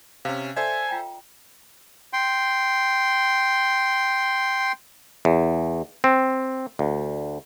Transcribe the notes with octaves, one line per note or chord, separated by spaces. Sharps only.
C3 C#4 F5 G#5
A4 C5 D5 E5 G#5
F4 G5 A#5
G5 C6
E2
C4
D2